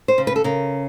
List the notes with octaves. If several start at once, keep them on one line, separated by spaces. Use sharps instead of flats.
C5
C#3
B4
A4
C#3 A#4